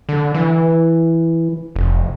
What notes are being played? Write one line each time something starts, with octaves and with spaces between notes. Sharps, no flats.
D3
E3
F1